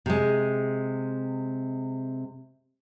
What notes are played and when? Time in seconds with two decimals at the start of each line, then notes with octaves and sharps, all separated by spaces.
0.06 C3 G#3